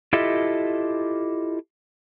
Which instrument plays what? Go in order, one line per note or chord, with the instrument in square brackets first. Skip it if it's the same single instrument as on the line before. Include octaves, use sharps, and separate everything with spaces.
[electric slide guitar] E4 F4 G4 A4 D#5 E5